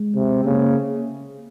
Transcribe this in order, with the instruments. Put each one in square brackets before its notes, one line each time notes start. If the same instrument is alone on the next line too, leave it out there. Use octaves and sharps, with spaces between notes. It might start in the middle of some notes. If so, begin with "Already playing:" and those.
Already playing: [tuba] G#3
[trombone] C3
[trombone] C#3 [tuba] A#3